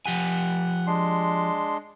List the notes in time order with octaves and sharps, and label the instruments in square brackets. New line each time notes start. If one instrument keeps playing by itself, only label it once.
[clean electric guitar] F3 G4 G#5 [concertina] F#5
[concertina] G#3 D4 C6